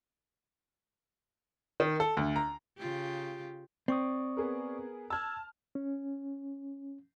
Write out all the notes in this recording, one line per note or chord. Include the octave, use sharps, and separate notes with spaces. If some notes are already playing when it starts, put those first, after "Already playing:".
D#3
A4
D2
A#5
C#3 F4 G4
C4 D5 C#6 D#6
B3 G#4 A#4
A5 E6 F6 G#6
C#4